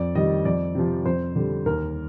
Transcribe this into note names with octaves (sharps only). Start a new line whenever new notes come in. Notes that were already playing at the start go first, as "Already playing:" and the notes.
Already playing: F2 D5
D#3 G3 D#5
F2 D5
C3 F3
F2 C5
D3 G3
D#2 A#4